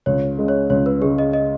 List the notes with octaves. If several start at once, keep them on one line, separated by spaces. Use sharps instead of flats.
C#2 C#5
C#3 G#3
C#5
C#2 C#5
B4
C#3 G#3 G#4
D#5
D#5